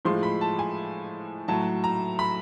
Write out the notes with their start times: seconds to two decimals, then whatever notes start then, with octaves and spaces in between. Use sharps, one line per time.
0.05 A2 F3 G#3 C6
0.23 B5
0.41 A5
0.59 G#5
1.48 A2 F#3 A5
1.84 A#5
2.19 B5